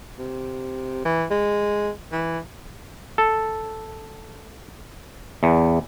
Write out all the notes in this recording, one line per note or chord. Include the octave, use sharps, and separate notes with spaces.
C3
E3
G#3
E3
A4
E2